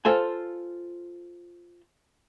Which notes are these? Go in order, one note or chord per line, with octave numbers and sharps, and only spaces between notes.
F4 A4 C5 G#5